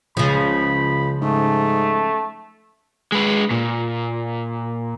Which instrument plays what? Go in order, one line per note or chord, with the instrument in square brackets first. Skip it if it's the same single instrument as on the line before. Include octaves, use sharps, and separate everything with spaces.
[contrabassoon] C#2 [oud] C#3 F3 [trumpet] B5
[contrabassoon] G#2 [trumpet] A3
[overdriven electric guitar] G#3 B4
A#2